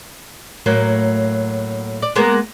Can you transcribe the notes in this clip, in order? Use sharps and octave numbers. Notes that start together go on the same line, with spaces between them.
A2 F#3 A#3
D5
G#3 A#3 B3